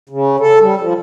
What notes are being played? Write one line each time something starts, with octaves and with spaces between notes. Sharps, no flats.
C#3
A4
G3
F3